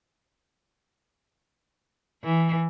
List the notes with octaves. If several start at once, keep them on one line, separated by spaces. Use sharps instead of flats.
E3